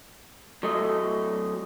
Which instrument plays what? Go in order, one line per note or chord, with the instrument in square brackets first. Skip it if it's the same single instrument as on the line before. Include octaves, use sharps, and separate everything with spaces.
[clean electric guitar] F#3 A3 D#5